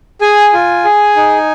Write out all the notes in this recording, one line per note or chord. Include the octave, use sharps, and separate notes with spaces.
G#4 G#5
F4
G#4
D#4